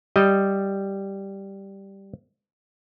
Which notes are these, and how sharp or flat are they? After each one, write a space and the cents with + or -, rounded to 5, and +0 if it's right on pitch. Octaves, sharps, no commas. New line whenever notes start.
G3 +0 D#5 +0